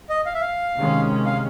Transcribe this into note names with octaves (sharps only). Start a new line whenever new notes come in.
D#5
F5
E5
F5
C3 D#3 G#3 C#4
F5